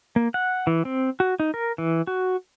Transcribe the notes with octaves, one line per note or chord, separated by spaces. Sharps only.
A#3
F#5
E3
C4
F#4
D#4
A#4
E3
F#4